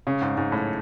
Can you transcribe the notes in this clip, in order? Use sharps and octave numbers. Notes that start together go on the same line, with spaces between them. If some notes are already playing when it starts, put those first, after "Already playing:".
C#3
G#2
G#2
A2